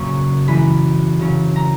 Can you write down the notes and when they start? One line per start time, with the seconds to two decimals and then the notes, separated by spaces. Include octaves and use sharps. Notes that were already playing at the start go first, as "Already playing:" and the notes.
Already playing: F#2 A#2 C#3 F#3 A#3 C#6
0.47 F#2 E3 G#3 B5
1.19 C#3 F#3 C#4
1.56 A#5